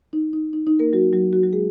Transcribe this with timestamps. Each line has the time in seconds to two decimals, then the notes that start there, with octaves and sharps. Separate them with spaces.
0.13 D#4
0.33 D#4
0.53 D#4
0.67 D#4
0.79 A#3 A#4
0.93 F#3 F#4
1.13 F#3 F#4
1.33 F#3 F#4
1.43 F#3 F#4
1.53 G#3 G#4